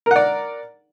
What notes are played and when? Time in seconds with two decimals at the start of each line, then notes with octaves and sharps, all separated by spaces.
0.06 A#4
0.11 F#5
0.16 D5